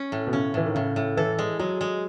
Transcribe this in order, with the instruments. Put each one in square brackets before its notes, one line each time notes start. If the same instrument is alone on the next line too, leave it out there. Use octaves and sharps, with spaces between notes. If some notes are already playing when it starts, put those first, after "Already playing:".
Already playing: [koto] C#4
A2
[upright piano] B2
[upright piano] C#3 [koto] C#4
[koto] A2 [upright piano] E3
[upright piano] D#3
[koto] A2 [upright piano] C#3
[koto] A2
[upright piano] E3 [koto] A4
[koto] G#3
[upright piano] F#3 [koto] G#3
[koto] G#3